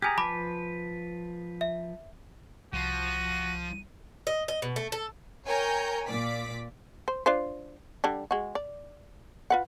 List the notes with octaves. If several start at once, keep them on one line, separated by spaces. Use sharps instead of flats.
G4 G#4 G#5 A#5 F6 G#6
F3 B4 A5 B5 D6
E5
C2 F3 F#4 D#7
D#5
D#5
B2
A3
A4
A#4 C#5 G5 G#5 A#5 G6
A#2 D5 D6 B6
C5
D4 F4 C5
D3 G3 D4
G#3 F#4
D5
F4 B4 F#5